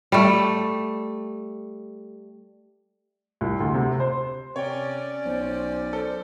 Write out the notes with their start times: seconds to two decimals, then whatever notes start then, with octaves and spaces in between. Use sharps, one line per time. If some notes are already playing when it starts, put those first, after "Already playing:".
0.12 G3 A3
3.41 C2
3.60 D2
3.74 C3
4.00 C5
4.56 C3 C#4 C#5 D5 G5
5.25 B1 C5
5.93 A4 C5